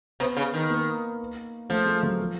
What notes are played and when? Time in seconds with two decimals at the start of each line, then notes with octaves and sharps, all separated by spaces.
0.20 C3 B3
0.37 C#3
0.54 D#3
0.70 A#3
1.69 F3 A3
1.86 G#3
2.03 F#3
2.19 F3